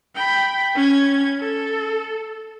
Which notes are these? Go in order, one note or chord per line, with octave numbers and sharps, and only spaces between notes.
G5 B5
C#4 G#6
A4